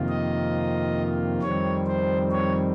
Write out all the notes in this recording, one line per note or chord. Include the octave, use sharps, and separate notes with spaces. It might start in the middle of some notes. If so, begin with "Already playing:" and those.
Already playing: F2 C3 D#3 A#3 F4
D#5
F2 D#3 G3 C4 C#5
C5
C#5